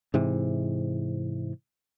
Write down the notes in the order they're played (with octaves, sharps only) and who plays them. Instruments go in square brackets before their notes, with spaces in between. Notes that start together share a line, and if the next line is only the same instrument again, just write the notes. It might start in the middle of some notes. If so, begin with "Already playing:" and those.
[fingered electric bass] G#2 C3 E3